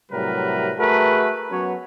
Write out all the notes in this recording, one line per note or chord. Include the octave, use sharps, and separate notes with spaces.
A2 C3 F#3 G3 A#4 B4
A3 F#4 G#4 A#4 B4
F#3 B3 C#4 F#4 C#5